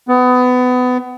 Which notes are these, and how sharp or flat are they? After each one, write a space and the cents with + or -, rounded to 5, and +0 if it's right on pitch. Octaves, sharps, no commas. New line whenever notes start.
B3 +25